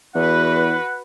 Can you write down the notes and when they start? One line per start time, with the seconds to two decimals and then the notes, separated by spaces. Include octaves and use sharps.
0.15 E2 F#4 B4 F#5